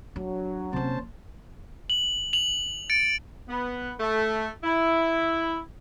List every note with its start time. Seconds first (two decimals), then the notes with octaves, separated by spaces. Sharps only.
0.16 F#3 D4
0.73 C3 F3 A#3 C#4 C5 A5
1.90 F#7
2.33 F7 F#7
2.90 A6 C#7 D7
3.49 B3
4.00 A3
4.64 E4